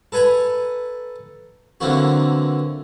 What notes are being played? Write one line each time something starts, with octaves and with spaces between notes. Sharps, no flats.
A4 B4 G#5 A#5 B5
D3 E3 F#3 A#3 C4 F#4